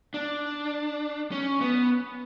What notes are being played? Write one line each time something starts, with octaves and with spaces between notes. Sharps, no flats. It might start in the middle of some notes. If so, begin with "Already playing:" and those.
D4
C#4
B3